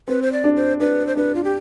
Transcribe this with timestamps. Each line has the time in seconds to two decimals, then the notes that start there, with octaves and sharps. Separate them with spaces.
0.08 C4 B4
0.22 C5
0.32 D5
0.44 D4
0.56 C5
0.80 D4 B4
1.07 C5
1.16 D4 B4
1.35 F4
1.44 G4